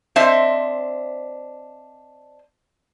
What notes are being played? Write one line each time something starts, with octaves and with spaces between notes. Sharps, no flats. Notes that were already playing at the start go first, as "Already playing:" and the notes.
C4 D4 C5 D#5 E5